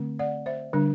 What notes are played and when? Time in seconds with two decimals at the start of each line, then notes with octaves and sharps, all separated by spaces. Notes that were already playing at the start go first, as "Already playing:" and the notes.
Already playing: D3 A3 C4
0.19 D5 F#5
0.46 C5 E5
0.73 D3 G3 D4